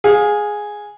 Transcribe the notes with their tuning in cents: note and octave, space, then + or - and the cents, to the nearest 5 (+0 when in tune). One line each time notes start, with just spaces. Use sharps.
G#4 +0 F5 +35